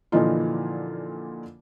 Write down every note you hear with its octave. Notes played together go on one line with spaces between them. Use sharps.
A#2 D3 E3 F3 D#4 F4